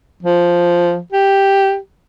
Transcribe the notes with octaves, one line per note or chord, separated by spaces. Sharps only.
F3
G4